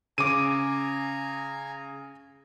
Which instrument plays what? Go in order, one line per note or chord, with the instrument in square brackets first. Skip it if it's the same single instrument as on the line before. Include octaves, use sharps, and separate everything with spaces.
[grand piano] C#3 [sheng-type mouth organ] G#5 A#5 [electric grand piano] D6 D#7